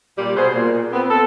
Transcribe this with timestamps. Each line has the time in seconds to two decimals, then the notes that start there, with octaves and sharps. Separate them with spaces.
0.17 A#2 G3
0.36 B2 G#4 C5
0.54 A#2
0.91 B3 C4
1.10 A4